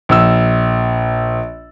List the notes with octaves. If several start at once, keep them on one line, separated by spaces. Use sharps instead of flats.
A#1 E6